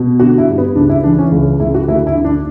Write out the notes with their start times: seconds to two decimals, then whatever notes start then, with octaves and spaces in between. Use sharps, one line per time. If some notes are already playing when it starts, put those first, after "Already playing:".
Already playing: B2
0.20 D3 F#4
0.38 E4
0.49 G2
0.58 B3
0.75 C#2 D4
0.89 E4
1.04 E3 D4
1.18 C#4
1.32 C#2
1.60 C#2 E4
1.74 F#4
1.88 D2 E4
2.07 E4
2.15 D3
2.24 D4